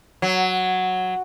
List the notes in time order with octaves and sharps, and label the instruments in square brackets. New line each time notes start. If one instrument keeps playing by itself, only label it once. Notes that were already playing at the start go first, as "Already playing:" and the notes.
[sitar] F#3